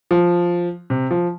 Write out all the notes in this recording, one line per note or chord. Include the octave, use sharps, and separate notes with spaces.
F3
C3
F3